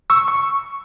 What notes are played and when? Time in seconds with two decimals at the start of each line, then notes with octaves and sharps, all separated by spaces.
0.10 C#6 E6
0.28 C#6